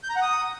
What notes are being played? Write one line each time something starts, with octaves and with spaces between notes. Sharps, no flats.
G6
A#5
F#5
D#6